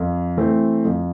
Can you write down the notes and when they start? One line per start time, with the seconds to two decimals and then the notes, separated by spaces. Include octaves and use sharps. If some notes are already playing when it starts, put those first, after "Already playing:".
Already playing: F2
0.37 E3 A3 C4
0.84 F2